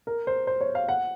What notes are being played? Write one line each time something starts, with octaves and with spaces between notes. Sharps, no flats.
A#4
C5
C5
C#5
F5
F#5